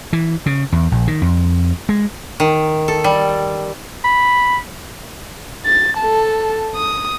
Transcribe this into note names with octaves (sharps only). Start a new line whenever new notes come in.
E3
C#3
E2
A#1
D#3
F2
G#3
D#3
A4
G3
B5
A6
A4 A5
D#6